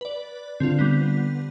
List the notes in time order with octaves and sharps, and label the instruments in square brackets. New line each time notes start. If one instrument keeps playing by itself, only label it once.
[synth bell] B4 D5
[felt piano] D3 [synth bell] C4 F4
[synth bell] G3 B3